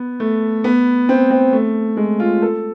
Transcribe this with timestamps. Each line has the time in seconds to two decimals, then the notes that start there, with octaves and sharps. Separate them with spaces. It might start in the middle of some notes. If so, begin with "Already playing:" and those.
Already playing: B3
0.20 A3
0.64 B3
1.09 C4
1.31 C4
1.53 A3
1.97 G#3
2.20 F4
2.42 A4